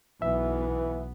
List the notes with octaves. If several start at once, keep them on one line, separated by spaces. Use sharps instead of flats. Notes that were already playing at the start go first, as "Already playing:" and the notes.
B1 E3 B3 E5